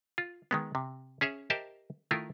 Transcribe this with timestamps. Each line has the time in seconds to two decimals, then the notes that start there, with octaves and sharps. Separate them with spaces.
0.18 F4
0.51 D#3 G#3 B3
0.75 C3
1.21 C#4 G#4 C#5 E5
1.50 G4 A#4 C5 D#5 E5 A5
2.11 D#3 A3 E4 F4 A#4